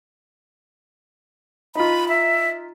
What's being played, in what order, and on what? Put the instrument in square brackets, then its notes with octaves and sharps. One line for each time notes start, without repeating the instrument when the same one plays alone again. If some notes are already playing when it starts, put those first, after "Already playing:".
[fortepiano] D#4 F4 [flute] B5
[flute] E5